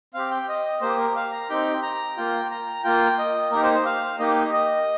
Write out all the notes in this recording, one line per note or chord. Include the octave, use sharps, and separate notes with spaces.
C4 G4 F5
G5
D#5
A#3 G4 C5
A#4
F5
A#5
C4 D#4 G4 G5
A#5
A#3 F4 G5
A#5
A#3 F4 G5
D#5
A#3 D#4 G4 A#4
C5
C5
F5
A#3 D#4 G4 D#5
D#5